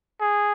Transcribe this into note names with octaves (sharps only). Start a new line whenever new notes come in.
G#4